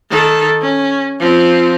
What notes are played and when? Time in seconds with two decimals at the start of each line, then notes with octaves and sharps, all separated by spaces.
0.10 D#3 A4
0.61 C#4
1.19 F3 C4